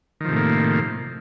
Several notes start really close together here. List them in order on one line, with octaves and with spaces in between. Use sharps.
D#3 F3 C3 A2 A#3